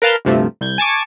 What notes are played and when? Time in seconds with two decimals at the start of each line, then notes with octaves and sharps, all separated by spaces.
0.02 A#4 B4 F5 A5 F6 G6
0.25 D2 G2 C3 F3 A3
0.61 C2 G6 G#6
0.78 G#5 A5 C#6 D6